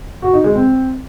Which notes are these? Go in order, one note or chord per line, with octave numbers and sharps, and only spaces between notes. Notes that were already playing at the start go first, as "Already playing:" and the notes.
F#4
D#4
G#3
C4